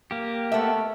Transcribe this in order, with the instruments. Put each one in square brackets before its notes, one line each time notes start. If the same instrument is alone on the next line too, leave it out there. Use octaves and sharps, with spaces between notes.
[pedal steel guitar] A#3 G4
[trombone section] A3 [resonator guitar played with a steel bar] B3 E5